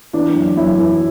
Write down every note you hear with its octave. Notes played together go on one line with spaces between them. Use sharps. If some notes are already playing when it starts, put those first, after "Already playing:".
E3 D4
F#2
F#2 E4
E3